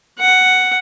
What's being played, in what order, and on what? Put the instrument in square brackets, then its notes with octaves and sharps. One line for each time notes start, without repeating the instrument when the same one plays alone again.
[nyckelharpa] F#5